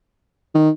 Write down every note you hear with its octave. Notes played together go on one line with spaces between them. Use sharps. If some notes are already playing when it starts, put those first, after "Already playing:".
D#3